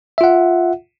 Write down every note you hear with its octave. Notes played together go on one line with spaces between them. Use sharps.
F4 E5 F#5